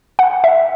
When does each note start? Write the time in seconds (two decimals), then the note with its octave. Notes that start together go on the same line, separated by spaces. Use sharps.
0.19 F#5
0.44 E5